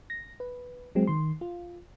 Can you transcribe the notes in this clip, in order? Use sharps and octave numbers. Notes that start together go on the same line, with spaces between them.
A#6
B4
F#3 G#3 C4
D#3 C6
F4